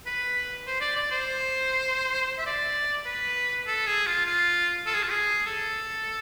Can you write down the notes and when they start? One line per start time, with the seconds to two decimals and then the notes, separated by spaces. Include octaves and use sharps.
0.06 B4
0.67 C5
0.81 D5
0.96 D5
1.11 C5
2.38 E5
2.46 D5
3.06 B4
3.66 A4
3.86 G#4
4.06 F4
4.25 F4
4.86 A4
4.94 G#4
5.03 F4
5.11 G#4
5.46 A4